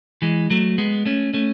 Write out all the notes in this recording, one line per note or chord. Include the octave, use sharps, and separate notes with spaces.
E3 G#3
F#3 A3
G#3 B3
A3 C#4
A3 C#4